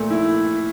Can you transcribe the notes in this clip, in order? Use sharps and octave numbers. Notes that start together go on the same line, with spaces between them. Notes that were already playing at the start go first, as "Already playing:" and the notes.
Already playing: A#2 A3
E4